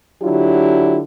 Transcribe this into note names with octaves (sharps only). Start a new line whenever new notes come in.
D3 F#3 D4 E4 F4 G4